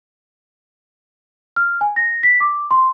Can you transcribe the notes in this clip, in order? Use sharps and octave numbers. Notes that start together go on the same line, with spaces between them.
F6
G#5
A#6
B6
D6
C6